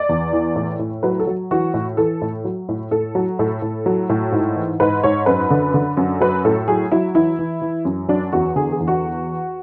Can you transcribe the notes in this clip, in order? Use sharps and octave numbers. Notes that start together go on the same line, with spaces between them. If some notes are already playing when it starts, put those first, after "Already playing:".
Already playing: D5
E2
E3
A2
A2
F#3 B4
A4
F#3
E3 F#4
A2
E3 A4
A2
F#3
A2
A2 A4
F#3
A2 A4
A2
F#3
A2
G#2
E3
G#2 B4
G#2 C#5
F#2 B4
D3
D3
F#2
F#3 B4
A2 A4
F#3 G#4
F#3 E4
E3 E4
E3
E3
F#2
F#3 D4
E2 F#4
D3 G#4
G#4
E2
F#4